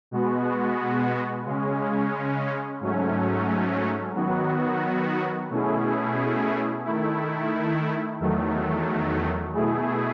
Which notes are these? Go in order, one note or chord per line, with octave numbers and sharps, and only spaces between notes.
B2 G#3 B3 F#4
C#3 G#3 C#4
G#2 F#3 A3 C#4
D#3 F#3 B3 F#4
B2 A3 C#4 E4 G#4
D#3 A3 E4
E2 D#3 F#3 A3
B2 A3 E4 G#4